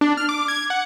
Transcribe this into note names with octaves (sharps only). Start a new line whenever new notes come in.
D4
F6
D6
G#6
F#5